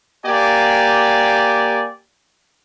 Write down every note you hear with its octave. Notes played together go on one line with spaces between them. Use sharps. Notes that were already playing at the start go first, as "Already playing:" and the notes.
A#3 G4 D5 G#5